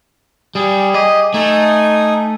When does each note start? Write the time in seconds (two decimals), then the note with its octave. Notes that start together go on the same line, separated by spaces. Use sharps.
0.55 G3 G#4
0.94 G4 G#4 D#5
1.34 A3 D#4 G#5 D#6